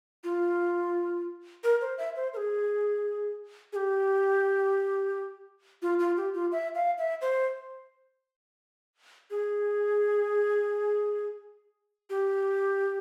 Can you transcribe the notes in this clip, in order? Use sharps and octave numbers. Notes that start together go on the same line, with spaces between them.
F4
A#4
C5
E5
C5
A#4
G#4
G#4
G4
F4
F4
G4
F4
E5
F5
E5
C5
G#4
G4